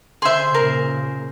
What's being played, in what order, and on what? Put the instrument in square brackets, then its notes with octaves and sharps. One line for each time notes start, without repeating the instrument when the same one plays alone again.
[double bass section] D3 [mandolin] G#4 C5 [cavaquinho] E5 C6
[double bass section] A#2 C#3 [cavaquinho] A#4